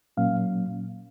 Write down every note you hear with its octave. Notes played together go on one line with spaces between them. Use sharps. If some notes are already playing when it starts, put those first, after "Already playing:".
A#2 F#3 A#3 C#4 F5